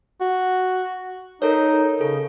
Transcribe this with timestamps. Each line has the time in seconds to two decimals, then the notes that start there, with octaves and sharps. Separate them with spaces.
0.21 F#4
1.42 D#4 A4 A#4 C#5
2.01 C#3 A4